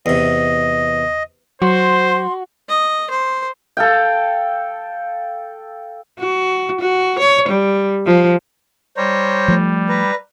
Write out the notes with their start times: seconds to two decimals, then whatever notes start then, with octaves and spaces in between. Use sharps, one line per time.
0.06 E2 C3 D#5
1.62 F#3 F#4 C5 C6
2.69 D#5
3.10 C5
3.77 A4 F5 G5
6.20 F#4
6.81 F#4
7.19 C#5
7.49 G3
8.06 F3
8.97 G3 C5 C#5 A#5
9.48 F3 A3
9.89 B4 A#5